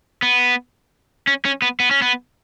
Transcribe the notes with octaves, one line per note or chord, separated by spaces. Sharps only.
B3
C#4
C#4
B3
B3
C#4
B3